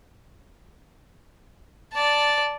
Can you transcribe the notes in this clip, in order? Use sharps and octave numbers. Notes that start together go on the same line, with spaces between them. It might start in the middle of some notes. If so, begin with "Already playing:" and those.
D5 A5